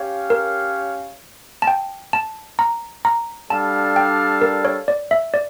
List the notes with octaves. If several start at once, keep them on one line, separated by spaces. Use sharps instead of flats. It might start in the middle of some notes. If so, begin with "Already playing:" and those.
Already playing: C#4 G4 C#5 F5
A#4
A5
G5
A5
A#5
A#5
G3 D4 A4 D5 F5 A5
G5
A#4
C#5
D5
E5
D5